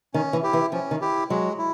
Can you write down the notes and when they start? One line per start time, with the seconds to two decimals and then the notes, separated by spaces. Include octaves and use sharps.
0.14 D#3 C#4
0.33 E3
0.43 E4 G4
0.53 E3
0.72 F3 C#4
0.91 D#3
1.01 E4 G4
1.30 F#3 G#3
1.59 E4